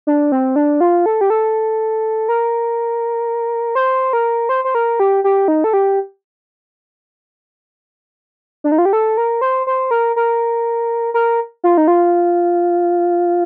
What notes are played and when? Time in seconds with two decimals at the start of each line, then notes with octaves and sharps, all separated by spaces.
0.07 D4
0.32 C4
0.56 D4
0.81 F4
1.06 A4
1.21 G4
1.30 A4
2.29 A#4
3.75 C5
4.13 A#4
4.49 C5
4.64 C5
4.75 A#4
5.00 G4
5.24 G4
5.48 D#4
5.64 A4
5.73 G4
8.64 D4
8.72 D#4
8.78 F4
8.85 G4
8.93 A4
9.17 A#4
9.41 C5
9.67 C5
9.91 A#4
10.16 A#4
11.14 A#4
11.64 F4
11.77 D#4
11.88 F4